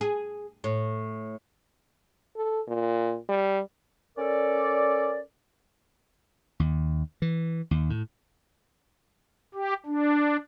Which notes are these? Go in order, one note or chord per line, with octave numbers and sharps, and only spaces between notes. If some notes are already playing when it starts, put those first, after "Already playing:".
G#4
A2
A4
A#2
G3
C#4 A4 A#4 D5
D#2
E3
D#2
A2
G4
D4